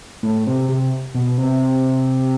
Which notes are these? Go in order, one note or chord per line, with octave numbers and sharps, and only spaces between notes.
A2
C3
C3
B2
C3